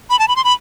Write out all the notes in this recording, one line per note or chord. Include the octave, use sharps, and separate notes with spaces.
B5
A5
B5
C6
B5